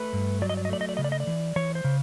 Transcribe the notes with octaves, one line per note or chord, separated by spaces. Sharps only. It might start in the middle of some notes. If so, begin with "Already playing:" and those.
Already playing: A3 B4
G2
F#3 D5
D#5
D5
D#5
A3 D5
D#5
D5
C#3 D#5
D5
D#5
D5
E3
E3 C#5
C5
C#3